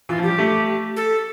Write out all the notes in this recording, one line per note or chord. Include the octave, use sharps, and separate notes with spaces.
E3 F4
F3
G3 G4
A3
A4